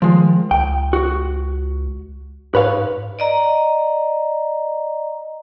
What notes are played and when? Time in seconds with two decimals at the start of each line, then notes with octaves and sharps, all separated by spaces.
0.02 D#3 F3 G#3
0.51 C#2 G5
0.93 F#4
2.55 G#2 B4 C#5 F5
3.19 D5 D#5 A#5